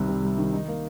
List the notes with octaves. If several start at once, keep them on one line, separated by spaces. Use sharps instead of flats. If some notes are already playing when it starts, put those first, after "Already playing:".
Already playing: C2 D#3 G3 C4
C3
G3
D#3
D#4
A#3